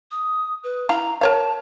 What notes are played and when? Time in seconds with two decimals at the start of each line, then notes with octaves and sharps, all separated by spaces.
0.11 D#6
0.63 B4
0.89 E4 F5 A#5
1.21 A#4 C#5 F5 A5